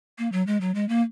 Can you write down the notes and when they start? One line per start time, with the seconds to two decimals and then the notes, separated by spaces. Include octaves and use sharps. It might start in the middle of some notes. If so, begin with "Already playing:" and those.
0.18 A#3
0.32 F#3
0.47 G#3
0.61 F#3
0.75 G#3
0.89 A#3